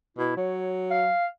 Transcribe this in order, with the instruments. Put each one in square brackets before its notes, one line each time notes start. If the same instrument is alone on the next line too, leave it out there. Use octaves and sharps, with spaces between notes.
[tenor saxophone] B2 [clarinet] E4
[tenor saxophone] F#3 [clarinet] C#5
[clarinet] F5